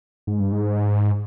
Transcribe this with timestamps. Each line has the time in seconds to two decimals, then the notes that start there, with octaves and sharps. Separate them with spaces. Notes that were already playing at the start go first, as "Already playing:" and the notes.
0.27 G#2
0.40 G2
0.52 G#2